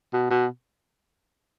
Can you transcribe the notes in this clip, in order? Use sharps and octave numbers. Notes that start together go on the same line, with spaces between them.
B2
B2